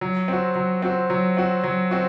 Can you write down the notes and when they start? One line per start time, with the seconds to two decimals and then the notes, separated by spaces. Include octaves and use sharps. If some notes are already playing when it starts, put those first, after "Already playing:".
0.01 F#3
0.28 C4 F#4
0.55 F#3
0.82 C4 F#4
1.10 F#3
1.37 C4 F#4
1.63 F#3
1.91 C4 F#4